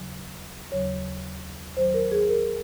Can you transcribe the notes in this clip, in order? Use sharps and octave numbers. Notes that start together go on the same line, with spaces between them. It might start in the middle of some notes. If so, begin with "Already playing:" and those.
Already playing: D#2 C#3 F#3
D#2 C#3 F#3 C#5
D#2 D#3 F#3 C5
A#4
G#4
A#4